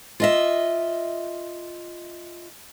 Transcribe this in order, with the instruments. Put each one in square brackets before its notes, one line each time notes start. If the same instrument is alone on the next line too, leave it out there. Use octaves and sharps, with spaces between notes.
[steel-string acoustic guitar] F4 D#5 E5